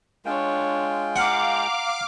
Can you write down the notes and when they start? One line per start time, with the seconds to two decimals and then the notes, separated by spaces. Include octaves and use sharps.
0.25 G#3 D4 F4 C#5 G5
1.16 F5 F#5 A#5 D6